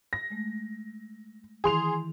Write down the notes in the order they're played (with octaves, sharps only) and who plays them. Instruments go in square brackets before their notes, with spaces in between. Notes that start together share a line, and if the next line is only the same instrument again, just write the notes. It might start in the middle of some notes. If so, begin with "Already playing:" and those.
[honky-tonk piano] A#6
[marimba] G#3 A3
[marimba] D#3 E3 E4 [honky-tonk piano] G#4 C6 F7